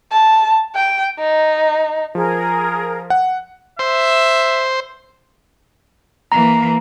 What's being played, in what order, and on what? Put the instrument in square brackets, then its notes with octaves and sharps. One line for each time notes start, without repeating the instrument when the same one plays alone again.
[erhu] A5
G5
D#4
[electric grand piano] F3 [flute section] G#4 A#4
[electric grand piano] F#5
[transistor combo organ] C5 [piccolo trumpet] E5
[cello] E3 A#3 [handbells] A#5